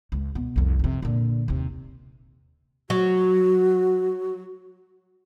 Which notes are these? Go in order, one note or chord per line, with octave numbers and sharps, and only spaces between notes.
C#2
B2
C2 F2
F2 C3
A#2 D3
D#2 C3
F#3 F#4